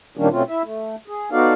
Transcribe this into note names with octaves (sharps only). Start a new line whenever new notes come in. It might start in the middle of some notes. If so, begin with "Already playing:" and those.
A#2 D#3 G3 A#3 C#4 D4
B2 A3 C4 C#4 F4
E4 E5
A3
G#4
B3 D#4 F#4 A4 D5 F5